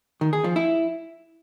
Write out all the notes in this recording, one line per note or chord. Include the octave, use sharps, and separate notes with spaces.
D#3
G#4
F3
E4